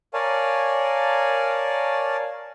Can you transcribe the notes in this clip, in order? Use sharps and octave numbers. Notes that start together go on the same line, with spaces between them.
A#4 C#5 D5 F5 G#5 A5